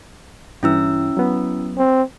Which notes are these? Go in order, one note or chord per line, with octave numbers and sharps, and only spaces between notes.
G2 E3 C#4 E4 E6
F#3 B3
C4